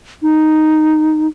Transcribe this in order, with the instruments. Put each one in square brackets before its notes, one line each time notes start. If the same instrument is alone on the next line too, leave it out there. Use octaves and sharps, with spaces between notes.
[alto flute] D#4